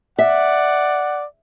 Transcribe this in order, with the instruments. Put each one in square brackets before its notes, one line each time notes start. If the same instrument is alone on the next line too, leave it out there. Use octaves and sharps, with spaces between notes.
[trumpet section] D5 F#5 [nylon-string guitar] E5